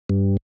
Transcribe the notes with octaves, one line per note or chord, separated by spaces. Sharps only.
G2